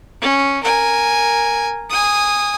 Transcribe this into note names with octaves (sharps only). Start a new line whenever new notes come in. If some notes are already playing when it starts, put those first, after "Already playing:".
C#4
A#4 G#5
G#5 D#6